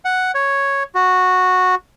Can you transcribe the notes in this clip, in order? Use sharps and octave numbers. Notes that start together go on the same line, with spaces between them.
F#5
C#5
F#4